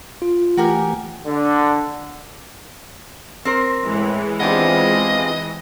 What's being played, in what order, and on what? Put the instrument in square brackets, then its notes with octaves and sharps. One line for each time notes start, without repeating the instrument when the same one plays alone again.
[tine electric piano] F4
[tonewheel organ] E3 A3 [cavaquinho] F#4 A#4 G#5 [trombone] G4
[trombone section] D3
[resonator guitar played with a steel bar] C4 A#4 C5
[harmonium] A2 [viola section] E3 G#3
[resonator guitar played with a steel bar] B3 D4 G4 [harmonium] C4 F4 G#4 [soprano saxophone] D#5